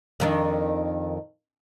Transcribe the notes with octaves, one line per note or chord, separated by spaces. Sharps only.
F2 D#3 D4